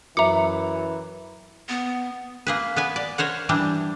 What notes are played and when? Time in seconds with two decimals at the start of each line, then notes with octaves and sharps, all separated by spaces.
0.17 F#2 E3 E5 A#5 D6 C#7
1.69 B3
2.47 A#3 G#4 B4
2.76 B3 B4 G#5
2.96 D5
3.18 A#4 C5 C#5 F#5
3.49 E3 G3 D4